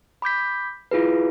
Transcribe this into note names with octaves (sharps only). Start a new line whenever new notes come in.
B5 D6 G6 B6
E4 F4 G#4 B4